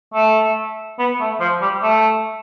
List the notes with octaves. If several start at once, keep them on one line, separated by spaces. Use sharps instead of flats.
A3
B3
A3
F3
G3
A3